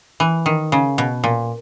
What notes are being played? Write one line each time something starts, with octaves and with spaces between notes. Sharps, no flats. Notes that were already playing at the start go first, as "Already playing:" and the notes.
E3
D#3
C#3
B2
A#2